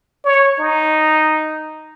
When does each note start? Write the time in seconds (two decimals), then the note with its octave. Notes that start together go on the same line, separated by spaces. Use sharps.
0.24 C#5
0.59 D#4